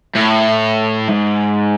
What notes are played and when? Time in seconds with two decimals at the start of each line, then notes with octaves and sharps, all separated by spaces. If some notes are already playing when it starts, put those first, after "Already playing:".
0.16 A2
1.09 G#2